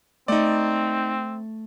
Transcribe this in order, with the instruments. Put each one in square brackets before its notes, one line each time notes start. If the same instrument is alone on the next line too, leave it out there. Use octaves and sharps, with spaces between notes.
[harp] A3 [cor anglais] C4 [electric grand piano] D#4 D5